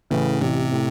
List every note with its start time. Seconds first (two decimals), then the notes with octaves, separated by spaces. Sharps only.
0.10 A2 C#3 E3
0.41 A1 C3
0.72 A2